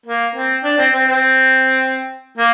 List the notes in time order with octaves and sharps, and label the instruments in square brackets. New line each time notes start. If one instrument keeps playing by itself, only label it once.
[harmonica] A#3
C4
D4
C4
C4
C4
A#3